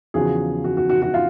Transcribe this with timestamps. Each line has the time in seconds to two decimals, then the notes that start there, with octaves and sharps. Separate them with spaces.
0.14 E2 C#3 F3 F#4 G#4
0.64 F#4
0.77 F#4
0.90 F#4
1.02 F#4
1.14 F4